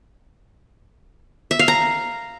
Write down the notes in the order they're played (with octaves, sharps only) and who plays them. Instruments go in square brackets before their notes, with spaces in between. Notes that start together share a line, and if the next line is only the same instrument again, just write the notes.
[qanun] E5
F5
A#5